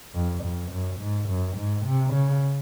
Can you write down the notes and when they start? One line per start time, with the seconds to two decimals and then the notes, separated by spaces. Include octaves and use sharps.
0.15 F2
0.43 F2
0.71 F#2
1.00 G#2
1.29 F#2
1.57 G#2
1.86 C3
2.13 C#3